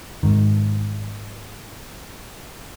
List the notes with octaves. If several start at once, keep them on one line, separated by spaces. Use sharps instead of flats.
G#1 G#2 D#3